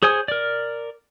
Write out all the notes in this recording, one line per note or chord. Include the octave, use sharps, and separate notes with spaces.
G#4 C5 C#5 G#5 D#6
A#4 D5